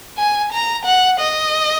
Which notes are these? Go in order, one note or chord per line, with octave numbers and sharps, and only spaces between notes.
G#5
A#5
F#5
D#5